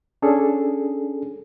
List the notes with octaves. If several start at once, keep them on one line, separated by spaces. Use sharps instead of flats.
C#4 D4 G#4 A4